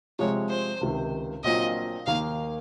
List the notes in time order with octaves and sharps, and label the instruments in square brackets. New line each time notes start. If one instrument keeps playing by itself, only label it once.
[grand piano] C3 F3 G#3 [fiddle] C#5
[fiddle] C5
[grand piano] C#2 C3 D#3
[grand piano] A#1 A#2 F#3 C4 F4 [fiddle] D#5
[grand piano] D#2 D#3 A#3 [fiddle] F5